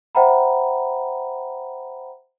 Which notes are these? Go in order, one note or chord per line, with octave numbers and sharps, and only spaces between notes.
C5 E5 F#5 G5 A#5 B5